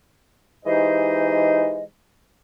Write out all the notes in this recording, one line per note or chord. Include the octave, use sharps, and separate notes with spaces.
E3 G#3 D#4 G4 C5 D#5